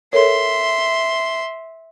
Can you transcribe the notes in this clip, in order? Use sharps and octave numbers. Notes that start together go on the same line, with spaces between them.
A4 A#4 C#5 E5 C6